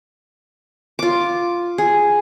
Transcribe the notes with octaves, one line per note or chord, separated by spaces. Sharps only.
F4 D6
G#4